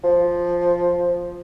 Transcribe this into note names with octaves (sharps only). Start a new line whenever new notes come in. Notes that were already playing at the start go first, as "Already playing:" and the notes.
F3